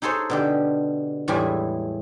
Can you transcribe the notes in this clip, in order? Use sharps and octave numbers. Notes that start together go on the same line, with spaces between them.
D#4 G#4 A4 C5 C#5
B2 D3 G4
E2 A2 G3 G#3 E4 G#5